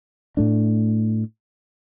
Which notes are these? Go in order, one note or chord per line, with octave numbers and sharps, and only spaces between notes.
A2 A3 D4